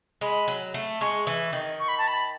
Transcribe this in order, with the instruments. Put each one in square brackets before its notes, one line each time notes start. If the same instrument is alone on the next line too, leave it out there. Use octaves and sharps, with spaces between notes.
[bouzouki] G#3 [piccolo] B5
[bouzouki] F#3
A3
[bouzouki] G#3 [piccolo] C#6
[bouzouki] E3
D#3
[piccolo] C#6
B5
A5
B5